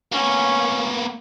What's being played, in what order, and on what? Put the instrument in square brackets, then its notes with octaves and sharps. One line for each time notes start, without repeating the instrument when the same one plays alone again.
[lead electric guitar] A#3 B3 [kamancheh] C#4